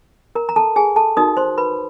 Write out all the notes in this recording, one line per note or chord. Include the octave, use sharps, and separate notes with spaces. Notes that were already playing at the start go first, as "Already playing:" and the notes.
A#4 A#5
A#5
A4 A5
G#4 G#5
A4 A5
D#4 F#4 A#4 D#5 D#6
C5 C6
B4 B5